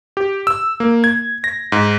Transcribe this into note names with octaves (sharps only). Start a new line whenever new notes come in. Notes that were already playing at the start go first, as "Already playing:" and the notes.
G4
E6
A#3
G#6
A#6
G#2